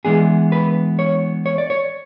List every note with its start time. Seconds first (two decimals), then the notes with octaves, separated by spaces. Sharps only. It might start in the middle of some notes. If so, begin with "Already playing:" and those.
0.05 E3 G#3 B3 D4 G#4
0.52 B4
0.99 C#5
1.46 C#5
1.58 D5
1.70 C#5